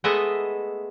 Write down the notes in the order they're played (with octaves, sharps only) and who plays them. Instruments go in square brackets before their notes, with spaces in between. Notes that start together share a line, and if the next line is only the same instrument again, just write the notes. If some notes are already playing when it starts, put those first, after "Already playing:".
[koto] G#3 A3 B3 B4 D#5 E5